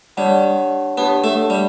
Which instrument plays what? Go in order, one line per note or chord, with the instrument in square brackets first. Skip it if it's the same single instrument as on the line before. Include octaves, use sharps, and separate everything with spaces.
[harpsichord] G3 [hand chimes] D4 G4 C#5 F#5 A5
[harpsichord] B3 [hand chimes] D4 G4 C#5 F#5 A5
[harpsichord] A3
G3